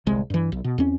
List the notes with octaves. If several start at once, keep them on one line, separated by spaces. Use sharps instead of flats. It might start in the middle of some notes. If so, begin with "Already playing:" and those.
D1 G1 C2 G#3
G2 E3
B1
B2
E2 C4 C#4